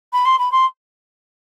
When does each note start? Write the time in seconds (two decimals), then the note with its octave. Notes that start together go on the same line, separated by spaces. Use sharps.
0.13 B5
0.25 C6
0.38 B5
0.52 C6